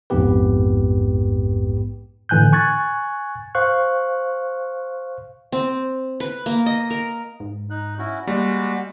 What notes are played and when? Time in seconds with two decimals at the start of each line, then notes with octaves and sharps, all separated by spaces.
0.10 A#1 F2 G#2 B3 G4 B4
2.29 A2 D3 E3 G#5 F#6 G6
2.52 G#5 C#6 F#6 G#6 A6
3.55 C5 F5 C#6 F#6
5.52 C4
6.20 B4
6.46 A#3
6.66 D#5
6.90 A#4
7.40 G#2
7.70 D#4 F#6
7.99 C#4 E4 F#4
8.27 G3 G#3 A#3 F#4